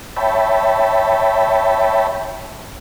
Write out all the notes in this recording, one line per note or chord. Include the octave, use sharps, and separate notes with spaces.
C#5 E5 G5 A5 B5